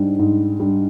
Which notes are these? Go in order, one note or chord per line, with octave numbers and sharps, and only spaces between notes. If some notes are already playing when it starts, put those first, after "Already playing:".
Already playing: G#2 G3 D4
G#2
G3 D4